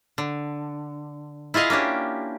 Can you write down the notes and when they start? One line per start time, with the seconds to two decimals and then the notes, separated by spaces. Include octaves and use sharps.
0.18 D3
1.54 E4 F4 G#4 D#5 F5
1.70 A#3 C#4 D4 G4